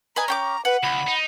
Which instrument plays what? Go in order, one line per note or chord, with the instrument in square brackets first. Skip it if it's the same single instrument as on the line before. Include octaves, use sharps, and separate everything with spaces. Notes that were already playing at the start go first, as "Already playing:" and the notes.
[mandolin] B4 D#5 G#5 [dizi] A#5
[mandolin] C#4 G5 D6
[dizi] B4 [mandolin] F#5
[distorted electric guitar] C#2 [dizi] B5
[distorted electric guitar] D#4